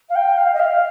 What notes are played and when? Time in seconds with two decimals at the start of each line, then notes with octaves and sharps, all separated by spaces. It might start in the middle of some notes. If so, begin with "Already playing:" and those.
0.09 F5
0.15 G5
0.37 F5
0.54 D#5
0.59 F5